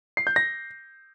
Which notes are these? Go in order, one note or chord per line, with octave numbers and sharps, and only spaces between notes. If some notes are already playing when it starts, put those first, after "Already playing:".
C7
G6
A#6